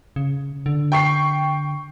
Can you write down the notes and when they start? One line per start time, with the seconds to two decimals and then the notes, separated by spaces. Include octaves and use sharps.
0.16 C#3
0.66 D3
0.92 G5 C#6 C7